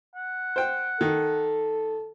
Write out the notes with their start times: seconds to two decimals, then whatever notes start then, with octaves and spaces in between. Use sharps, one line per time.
0.15 F#5
0.56 C5 G5
1.01 D#3 A4